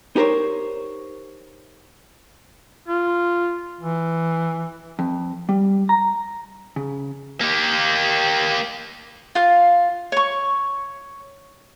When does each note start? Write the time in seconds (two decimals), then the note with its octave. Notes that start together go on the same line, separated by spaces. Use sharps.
0.16 D#4 G4 A#4 C5 C#5
2.88 F4
3.80 E3
4.99 F2
5.49 G3
5.89 A#5
6.76 C#3
7.41 A#3 G4
9.35 F4 F5
10.12 C#5 C#6